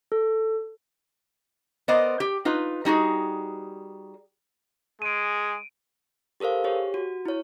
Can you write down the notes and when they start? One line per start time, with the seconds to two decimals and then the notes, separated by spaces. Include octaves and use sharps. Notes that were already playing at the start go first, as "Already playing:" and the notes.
0.12 A4
1.88 B3 A#4 C5 D5 D#5
2.20 G4
2.45 D#4 F4 B4
2.85 G3 D#4 F#4 G#4
5.02 G#3 G#4 D7 D#7
6.40 G4 A4 A#4 C5 F5
6.64 G4 G#4 C#5
6.94 F#4
7.26 E4 C#5